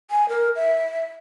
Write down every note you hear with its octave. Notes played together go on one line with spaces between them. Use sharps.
G#5
A#4
E5